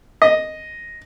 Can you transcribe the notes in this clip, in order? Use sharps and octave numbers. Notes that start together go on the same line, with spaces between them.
D#5